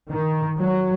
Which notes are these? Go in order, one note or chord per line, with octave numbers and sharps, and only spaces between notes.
D#3
F#3